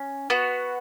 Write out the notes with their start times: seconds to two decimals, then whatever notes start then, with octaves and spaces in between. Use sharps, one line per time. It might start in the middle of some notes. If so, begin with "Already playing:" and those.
Already playing: C#4
0.30 B3 F#4